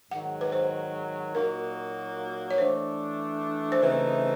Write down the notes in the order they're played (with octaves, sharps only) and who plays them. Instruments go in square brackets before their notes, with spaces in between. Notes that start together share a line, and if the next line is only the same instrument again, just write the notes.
[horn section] G#2 [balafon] F#5
[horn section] D#3 F#3
[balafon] B4
C5
[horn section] A#2 F#3 A#3 D#4 F#4 [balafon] A#4
[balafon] C#5
[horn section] E3 A3 D4 [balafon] C5
[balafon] C5
[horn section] C#3 E3 A3 C4 D#4 [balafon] B4